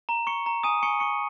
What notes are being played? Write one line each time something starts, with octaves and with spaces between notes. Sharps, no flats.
A#5
C#6 C#7
A#5
G#5 D#6 D#7
G#5 C#6 C#7
C#6 C#7